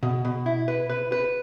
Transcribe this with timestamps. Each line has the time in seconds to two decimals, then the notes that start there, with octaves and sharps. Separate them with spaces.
0.03 B2
0.25 B2
0.46 E4
0.68 B4
0.90 B4
1.12 B4